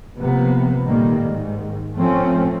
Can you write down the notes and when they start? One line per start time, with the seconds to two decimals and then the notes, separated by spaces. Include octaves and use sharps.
0.18 C3 F3 A#3 B3
0.85 A#2 D#3 G3 A3 A#3
1.23 G#2 D#3
1.96 F3 A3 C4 C#4